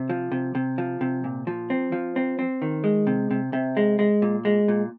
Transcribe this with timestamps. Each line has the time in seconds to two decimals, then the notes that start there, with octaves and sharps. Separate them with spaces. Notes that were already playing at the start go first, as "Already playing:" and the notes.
Already playing: C3
0.09 F3
0.32 C3
0.55 C3
0.78 F3
1.01 C3
1.24 A#2
1.47 F3
1.70 C4
1.92 F3
2.16 C4
2.39 C4
2.62 D#3
2.84 G#3
3.07 C3
3.31 C3
3.53 C3
3.77 G#3
3.99 G#3
4.22 A#2
4.45 G#3
4.68 A#2